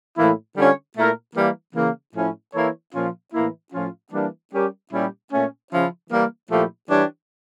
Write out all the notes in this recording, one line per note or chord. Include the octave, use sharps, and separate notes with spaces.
A2 E3 A#3 E4
D3 G3 C#4 F4 C#5
A#2 A3 E4 A#4
E3 G3 A#3
C#3 E3 A#3
A2 F3 C#4 E4
E3 A#3 E4 A4 C#5
A#2 F3 C#4 F4
A2 E3 A#3 E4
A2 F3 C#4 F4
E3 G3 A#3 D4
G3 C#4 G4 A#4
A#2 G3 C#4 E4 G4
A#2 A3 C#4
C#3 F3 C#4 E4
E3 G3 A#3
A#2 F3 A3 E4 G4
E3 G3 D4 G4 C#5